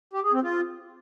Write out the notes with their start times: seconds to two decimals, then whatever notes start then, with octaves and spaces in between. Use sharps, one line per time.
0.13 G4
0.23 G#4
0.33 C4
0.43 F4